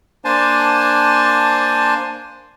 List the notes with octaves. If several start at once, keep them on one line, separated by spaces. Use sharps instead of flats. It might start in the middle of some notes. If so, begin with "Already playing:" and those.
A#3 D4 C5 G#5 A5